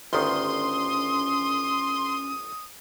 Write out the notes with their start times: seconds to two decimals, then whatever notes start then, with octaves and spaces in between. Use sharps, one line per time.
0.13 G1 D2 D#3 C#4 C6 D#6